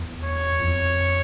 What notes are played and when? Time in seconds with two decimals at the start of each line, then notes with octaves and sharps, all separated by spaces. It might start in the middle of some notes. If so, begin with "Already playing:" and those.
Already playing: E2
0.24 C#5
0.60 F2